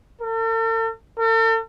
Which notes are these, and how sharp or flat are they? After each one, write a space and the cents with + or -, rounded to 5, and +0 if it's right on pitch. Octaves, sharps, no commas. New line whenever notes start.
A4 +45
A4 +45